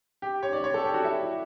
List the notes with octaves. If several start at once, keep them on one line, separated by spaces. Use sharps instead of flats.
G4
C#5
D5
C#5
A4
G4
F#4
E4